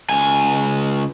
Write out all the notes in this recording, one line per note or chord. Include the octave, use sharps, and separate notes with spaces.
C#2 G#5